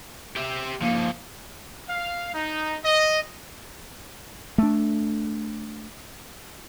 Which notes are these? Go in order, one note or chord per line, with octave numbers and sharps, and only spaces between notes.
G4 E5
F3 A#3 D#4
F5
D#4
D#5
A3 D4